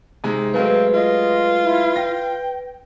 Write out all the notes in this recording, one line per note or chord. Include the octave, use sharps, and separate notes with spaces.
C3 G#3 D#4
F#3 G#3 A3 C4 B4 F5
F4 D#5
E4
G5 A#6